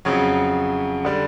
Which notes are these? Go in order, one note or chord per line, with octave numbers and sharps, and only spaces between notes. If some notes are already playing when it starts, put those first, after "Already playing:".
F2 C#3 F#3
D3 G3